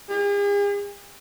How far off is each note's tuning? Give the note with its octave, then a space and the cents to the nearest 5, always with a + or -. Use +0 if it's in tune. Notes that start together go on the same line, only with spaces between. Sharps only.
G#4 -45